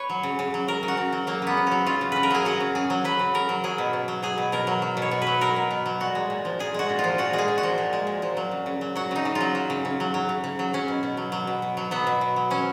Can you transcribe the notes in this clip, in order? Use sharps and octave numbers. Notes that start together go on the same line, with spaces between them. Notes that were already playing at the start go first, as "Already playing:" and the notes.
Already playing: B4 C#5
F#3
C#3
C#3
F#3
F#3 A#4
C#3
F#4
C#3
F#3
F#3 A#3
C#3 B3
C#3
F#3 C#4
F#3 F4
C#3
C#3 B4
A#4
F#3 G#4
F#3 F#4
C#3
C#3 G#4
F#3
F#3 B4
C#3
C#3 A#4
F#3
F#3 G#4
B2
B2
F#3
F#3 G#4
B2
B2 A#4
F#3
F#3
B2
C#5
B2
F#3 B4
F#3 A#4
B2
B2
F#3
A#2 F#4
G#3
A#2
F3
A#2 G#4
G#3 F#4
A#2
F4
F3
A#2 F#4
G#3
G#4
A#2
F#4
F3
A#2
G#3
A#2
F3
F#3
C#3
C#3
F#3
F#3 F#4
C#3 D#4
C#3
F4
F#3
F#3
C#3
C#3
F#3
F#3
C#3
C#3
F#3
F#3 C#4
B2
B2
F#3
F#3
B2
B2
F#3
F#3 B3
B2
B2
F#3
F#3 C#4